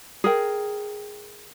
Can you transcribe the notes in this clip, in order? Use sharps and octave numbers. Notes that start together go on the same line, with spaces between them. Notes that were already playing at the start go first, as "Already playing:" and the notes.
G#4 A#4 G5